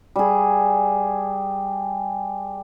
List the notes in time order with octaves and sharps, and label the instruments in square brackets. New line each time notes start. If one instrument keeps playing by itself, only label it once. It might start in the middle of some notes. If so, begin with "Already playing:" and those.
[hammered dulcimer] G3 G#4